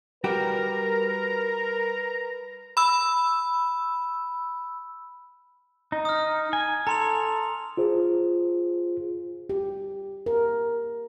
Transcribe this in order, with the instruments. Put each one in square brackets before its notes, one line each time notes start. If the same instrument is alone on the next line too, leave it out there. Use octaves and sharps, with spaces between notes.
[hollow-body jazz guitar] G3 F#4 G4 [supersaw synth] A#4 [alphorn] B4 [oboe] A#5
[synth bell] B5 E6
[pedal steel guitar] D#4
[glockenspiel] D#6 F6
[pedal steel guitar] G#5
[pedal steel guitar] A4 [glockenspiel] A#5 C6 F7
[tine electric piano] F4 G#4 C5
[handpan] G4
A#4